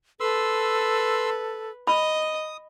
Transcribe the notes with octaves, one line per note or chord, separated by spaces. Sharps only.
A4 B4 C6 E6
D#5 B5 D#6